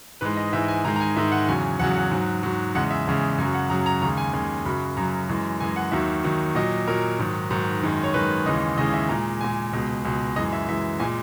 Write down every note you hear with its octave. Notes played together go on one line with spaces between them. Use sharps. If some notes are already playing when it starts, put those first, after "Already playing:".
G#2 E3 G#3 B4
D#5
G#2 E3 G#3 E5
G#5
G#2 D#3 G#3 A#5
A#5
G#5
G#2 D#3 G#3 E5
F#5
E2 C#3 F#3 G#5
E2 C#3 F#3 F#5
F#5
G#2 F#3
G#2 F#3
E2 C#3 G#3 F#5
E5
E2 C#3 G#3
F#2 C#3 F#3 G#5
F#5
F#2 C#3 F#3 A#5
A#5
D#2 C#3 G#3 A#5
G#5
D#2 C#3 G#3 G#5
F#2 C#3 F#3 B5
F#2 C#3 F#3 A#5
F#2 E3 G#3
F#2 E3 G#3 G#5
F#5
D#2 D#3 F#3 E5
D#2 D#3 F#3
A#2 F#3 D#5
A#2 F#3 A#4
G#2 D#3 F#3
G#2 D#3 F#3
F#2 D#3 G#3
C#5
F#2 D#3 G#3 B4
D#2 C#3 E3 G#3 D#5
D#2 C#3 E3 G#3 D#5
E5
A#2 G#3 A#5
A#2 G#3 G#5
C#2 B2 G#3
C#2 B2 G#3
F#2 E3 G#3 D#5
E5
F#2 E3 G#3 E5
A#2 G#3 G#5